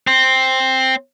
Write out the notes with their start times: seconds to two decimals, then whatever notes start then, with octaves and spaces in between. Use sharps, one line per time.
0.07 C4